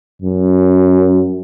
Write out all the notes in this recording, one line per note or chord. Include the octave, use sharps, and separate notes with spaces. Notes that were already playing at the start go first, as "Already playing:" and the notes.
F#2